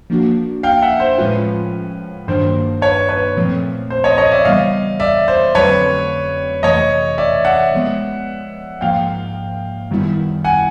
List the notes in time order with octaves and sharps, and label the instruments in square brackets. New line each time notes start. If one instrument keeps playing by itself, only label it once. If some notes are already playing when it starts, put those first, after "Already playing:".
[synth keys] F3 A#3 D4 F#4
[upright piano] F5 G5
E5 F#5
C5
[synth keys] A2 F3 G#3 C#4 F4 [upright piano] B4
[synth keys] G2 D#3 F#3 A#3 D4 [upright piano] C5
[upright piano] B4 C#5
B4 C#5
[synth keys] A#2 F3 A3 C4
[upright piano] C5
C#5 D#5
C#5 D#5
D5 E5
[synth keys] C#3 E3 G3 B3 [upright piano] D#5 F5
[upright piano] D5 E5
C5
[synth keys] F2 D3 F#3 A3 C4 [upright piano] B4 C#5
[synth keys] F2 C3 E3 A3 [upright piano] C#5 D#5
[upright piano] D5 E5
E5 F#5
[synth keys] F3 G#3 B3
[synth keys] G#2 F3 A#3 [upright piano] F5 G5
[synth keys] F#2 D#3 G3 B3 E4
[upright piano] F#5 G#5